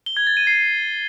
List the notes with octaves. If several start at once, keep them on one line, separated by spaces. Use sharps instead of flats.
G7
G#6
A6
D#7
C7